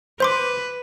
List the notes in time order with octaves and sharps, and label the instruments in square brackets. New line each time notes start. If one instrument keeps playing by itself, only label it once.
[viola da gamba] B4 [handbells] C5 C6 D6